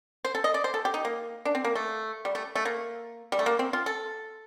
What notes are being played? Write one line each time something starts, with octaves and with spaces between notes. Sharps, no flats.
C5
A4
D#5
D5
C5
A4
G4
D#4
A#3
D4
C4
A#3
A3
G3
A3
A3
A#3
G3
A3
A#3
C4
F4
A4